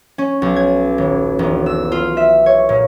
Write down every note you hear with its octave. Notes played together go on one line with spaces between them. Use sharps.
C#4
B1
G#6
D#1
E1
E6
F4
E5
C#5
A#2